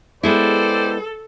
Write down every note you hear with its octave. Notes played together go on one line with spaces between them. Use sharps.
G#3 B3 E4 G4 A4 C5 D5